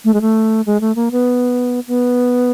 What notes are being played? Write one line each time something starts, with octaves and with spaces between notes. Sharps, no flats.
A3
G#3
A3
G#3
A3
A#3
B3
B3